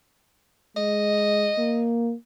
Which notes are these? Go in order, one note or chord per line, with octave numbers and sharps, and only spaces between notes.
G#3 D#5
A#3